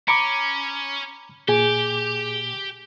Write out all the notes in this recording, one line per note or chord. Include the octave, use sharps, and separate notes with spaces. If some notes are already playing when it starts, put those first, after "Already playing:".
C#4 A#5 B5 D6 C#7 D7
A#2 G4 G#4 G#5